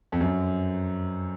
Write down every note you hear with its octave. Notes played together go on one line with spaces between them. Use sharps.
F2
F#2